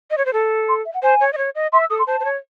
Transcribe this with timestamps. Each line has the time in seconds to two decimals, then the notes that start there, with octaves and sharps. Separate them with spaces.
0.11 D#5
0.18 C#5
0.26 C5
0.33 A4
0.68 C6
0.85 E5
0.94 F#5
1.03 C5 G#5
1.20 C#5
1.33 D#5
1.38 C#5
1.55 D#5
1.72 E5 C6
1.81 E6
1.90 A4 D#6
1.99 C6
2.07 C5 A5
2.20 C5
2.25 C#5